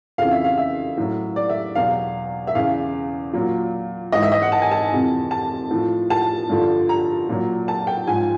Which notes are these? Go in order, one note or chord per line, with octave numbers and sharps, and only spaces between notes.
F2 C#3 E3 F5
E5
F5
E5
A2 F#3
D5
E5
E2 B2 F#3 F5
E5
E2 C#3 E3 F5
A#2 F#3
G#2 E3 D#5
E5
D#5
F#5
A5
G#5
A5
F2 C3 E3
A5
A2 F3
A5
G2 D3 F3
A#5
A#2 F#3
A5
G5
G#2 F3 G#5